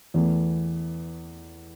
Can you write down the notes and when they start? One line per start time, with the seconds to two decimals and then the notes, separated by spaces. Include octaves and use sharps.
0.14 E2 E3 A3